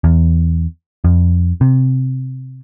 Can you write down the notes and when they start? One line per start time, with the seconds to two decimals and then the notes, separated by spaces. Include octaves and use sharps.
0.04 E2
1.04 F2
1.61 C3